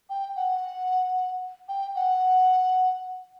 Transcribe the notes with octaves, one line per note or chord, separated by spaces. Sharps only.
G5
F#5
G5
F#5